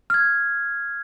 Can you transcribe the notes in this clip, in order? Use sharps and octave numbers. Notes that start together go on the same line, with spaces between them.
F6 G#6